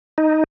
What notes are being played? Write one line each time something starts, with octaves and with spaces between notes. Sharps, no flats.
D#4